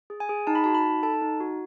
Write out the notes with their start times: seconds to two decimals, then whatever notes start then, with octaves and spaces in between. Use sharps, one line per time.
0.10 G#4
0.20 G#5
0.29 G#4
0.47 D#4 A5
0.55 B5
0.64 F#4 A5
0.75 B5
0.84 D#4
1.03 A4 A5
1.22 D#4
1.40 F#4